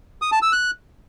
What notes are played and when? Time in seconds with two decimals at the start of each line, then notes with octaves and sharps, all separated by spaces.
0.22 D#6
0.32 A5
0.42 E6
0.52 F#6